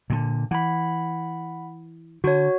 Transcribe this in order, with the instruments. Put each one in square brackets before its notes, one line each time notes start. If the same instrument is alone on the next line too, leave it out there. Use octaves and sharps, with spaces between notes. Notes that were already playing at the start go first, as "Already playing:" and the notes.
[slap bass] A#2 D3
[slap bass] E3 [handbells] F#5 B5
[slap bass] D3 [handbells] F#4 C#5